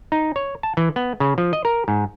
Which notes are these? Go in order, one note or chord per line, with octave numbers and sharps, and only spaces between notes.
D#4
C#5
A5
E3
B3
C#3
F3
D#5
A#4
G#2